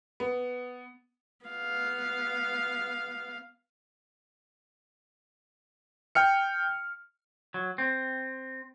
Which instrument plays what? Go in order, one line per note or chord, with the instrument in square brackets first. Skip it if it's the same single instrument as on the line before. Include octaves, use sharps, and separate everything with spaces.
[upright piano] B3
[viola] B3 F5
[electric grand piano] G5 F6 C#7
[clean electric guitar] F#3
C4